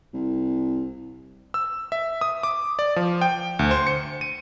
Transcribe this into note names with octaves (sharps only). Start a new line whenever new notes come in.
C2
E6
E5
D#6
D6
D5
F3
G5
D2
C5
C#7
D#7